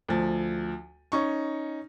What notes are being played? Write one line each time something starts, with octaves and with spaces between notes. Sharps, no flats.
D2 F3
C#4 D#4 C#6